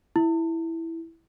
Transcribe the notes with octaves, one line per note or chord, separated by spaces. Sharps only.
E4